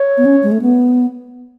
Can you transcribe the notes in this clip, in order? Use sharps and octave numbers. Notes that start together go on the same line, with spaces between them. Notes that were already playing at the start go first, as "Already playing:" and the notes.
Already playing: C#5
B3
C#4
G#3
A3
B3